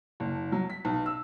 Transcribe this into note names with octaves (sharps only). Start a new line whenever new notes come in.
F#1
F#3
B6
B1
E6